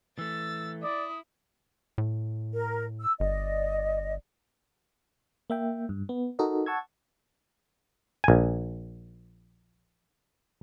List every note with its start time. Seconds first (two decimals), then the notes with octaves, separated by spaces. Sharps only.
0.19 E3 A3 E6 A6
0.83 E4 D5 D#6
1.98 A2
2.53 A#4
3.01 E6
3.20 G1 D5 D#5
5.50 A#3 E5 G5
5.89 G2
6.09 B3
6.39 D#4 F#4 A4 A#4 D#5
6.66 F#5 A5 C#6 E6 G#6
8.24 A#1 G#5